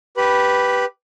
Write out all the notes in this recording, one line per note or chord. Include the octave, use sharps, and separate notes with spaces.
G4 B4 B5